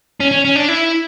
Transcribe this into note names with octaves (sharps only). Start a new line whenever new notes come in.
C#4
C#4
C#4
D4
E4